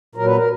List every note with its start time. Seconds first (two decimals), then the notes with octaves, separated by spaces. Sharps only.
0.15 A#2 F#3 A#4
0.26 B4
0.36 A#4